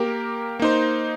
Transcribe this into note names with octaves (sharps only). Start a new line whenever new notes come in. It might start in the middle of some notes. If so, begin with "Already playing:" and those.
Already playing: A#3 G4 A#4
A#3 D#4 C5